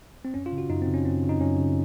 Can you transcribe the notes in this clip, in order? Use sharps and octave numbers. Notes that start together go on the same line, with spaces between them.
C4
F#2 C#4
F4
C#3
F#4
F#2 D#4
C4
C#3
C#4
F#2 C4
C#3
D#4
F#2 C#4
C#3